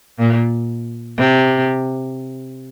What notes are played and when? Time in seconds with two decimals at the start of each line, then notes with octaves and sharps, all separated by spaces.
0.19 A#2
1.18 C3